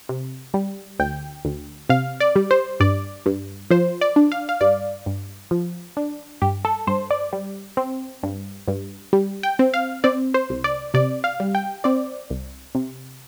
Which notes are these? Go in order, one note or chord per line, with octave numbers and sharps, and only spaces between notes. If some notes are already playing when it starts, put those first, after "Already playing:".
C3
G3
D2 G5
D2
C3 F5
D5
G3
C5
G2 D5
G2
F3 C5
D5
D4
F5
F5
G2 D5
G2
F3
D4
G2 G4
A4
G2 C5
D5
G3
C4
G2
G2
G3
G5
C4
F5
C4 D5
C5
C2
D5
C3 D5
F5
G3
G5
C4 D5
C2
C3